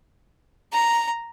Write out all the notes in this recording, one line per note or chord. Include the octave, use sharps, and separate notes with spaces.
A#5